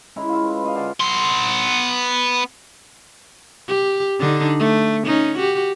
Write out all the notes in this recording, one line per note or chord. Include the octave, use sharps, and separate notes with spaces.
G#3 C#4 E4 A#5
F4 E5
B4
F4 D#5 F5
D3 D5 F5 A5
B3 C6
G4
D3 D4 D#4
A3
C#4 D#4
F#4 G4